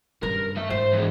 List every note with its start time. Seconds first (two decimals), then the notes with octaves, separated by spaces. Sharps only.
0.22 G2 C#3 A#4
0.56 A3 E5
0.70 G#2 C5
0.93 E3 G#3